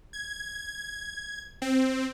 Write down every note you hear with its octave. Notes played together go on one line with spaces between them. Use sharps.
G#6
C4